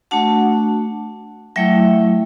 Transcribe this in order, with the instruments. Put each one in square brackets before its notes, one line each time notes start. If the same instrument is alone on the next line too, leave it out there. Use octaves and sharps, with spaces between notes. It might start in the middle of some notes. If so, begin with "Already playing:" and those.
[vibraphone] A3 D4 F#4 F#5 A5
F#3 A3 E4 E5 G5